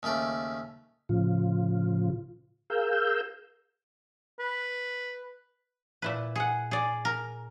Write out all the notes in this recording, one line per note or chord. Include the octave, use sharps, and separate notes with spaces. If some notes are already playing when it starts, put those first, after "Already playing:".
D#2 C#3 A3 D5
A2 C#3 F3 F4
G#4 A#4 F5 E6 G6
B4
A#2 E4 B4
G#4 F#5
G#4 D5
A#4